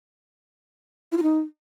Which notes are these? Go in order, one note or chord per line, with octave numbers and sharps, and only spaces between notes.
E4
F4
D#4